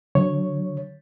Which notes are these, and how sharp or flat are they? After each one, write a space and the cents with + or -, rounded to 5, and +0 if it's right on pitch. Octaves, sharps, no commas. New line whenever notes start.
D3 +0 F#3 +0 C#5 +0